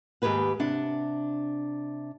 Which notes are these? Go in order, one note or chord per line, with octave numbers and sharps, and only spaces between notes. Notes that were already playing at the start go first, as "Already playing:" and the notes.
D#2 G#2 G4 G#4 B4 F#5
C3 D4 F#5